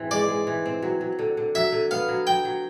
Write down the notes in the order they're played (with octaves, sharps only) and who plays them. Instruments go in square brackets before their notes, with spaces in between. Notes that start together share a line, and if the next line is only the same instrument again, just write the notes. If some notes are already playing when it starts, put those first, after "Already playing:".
Already playing: [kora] G#2 E3 C4
[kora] G#3 [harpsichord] D5
[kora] G#3
E3
C4
F#3
F#3
D3
D3
[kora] F#3 [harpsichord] E5
[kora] D3
[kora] B3 [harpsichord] F5
[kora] F#3
[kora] F#3 [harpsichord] G5
[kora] F#3